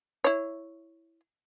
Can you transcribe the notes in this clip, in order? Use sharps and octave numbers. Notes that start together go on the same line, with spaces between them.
E4 C#5